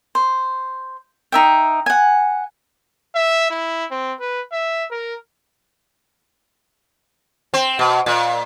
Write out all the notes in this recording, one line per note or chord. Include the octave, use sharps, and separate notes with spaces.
C5
D#4 E5 G5
F#5 G#5
E5
E4
C4
B4
E5
A#4
C4
B2
A#2